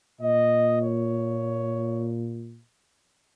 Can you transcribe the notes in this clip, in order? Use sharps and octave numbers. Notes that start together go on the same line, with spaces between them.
A#2 D#5
C#5